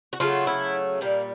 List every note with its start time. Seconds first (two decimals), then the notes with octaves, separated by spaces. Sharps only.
0.13 F#4
0.20 C#3 F#3 A3 F4
0.47 E4
1.01 A#2 G3 A#3